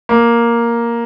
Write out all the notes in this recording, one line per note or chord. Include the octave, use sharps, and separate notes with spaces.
A#3